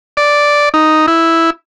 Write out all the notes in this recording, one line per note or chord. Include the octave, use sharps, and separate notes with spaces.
D5
D#4
E4